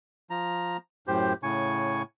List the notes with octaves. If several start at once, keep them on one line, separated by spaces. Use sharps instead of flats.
F3 A#5
F#2 A2 G4 C5
A2 C#3 G#5 C#6